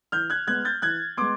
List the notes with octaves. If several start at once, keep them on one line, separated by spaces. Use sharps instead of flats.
E3 F6 G6
F#6 G#6
G#3 B3 F#6 G#6
G6 A6
E3 F#6 G#6
G#3 B3 C6 D6